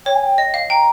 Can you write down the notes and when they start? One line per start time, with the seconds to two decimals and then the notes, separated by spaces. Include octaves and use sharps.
0.06 C#5 G5
0.14 G#5
0.23 G5
0.38 D#5
0.54 F5
0.70 G5 A#5